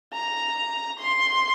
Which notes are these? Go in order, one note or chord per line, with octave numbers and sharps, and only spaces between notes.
A#5
C6